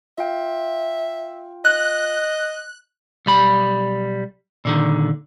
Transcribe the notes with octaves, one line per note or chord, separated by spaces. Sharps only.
F4 E5 F5 G5
D#5 F#6
B1 G3 B5
A#2 D3 D#3